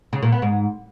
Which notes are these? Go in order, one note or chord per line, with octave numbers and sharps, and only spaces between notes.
C#3
A#2
B3
G#2